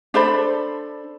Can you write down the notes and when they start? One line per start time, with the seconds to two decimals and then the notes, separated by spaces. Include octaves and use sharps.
0.14 D4 A4 C5 B5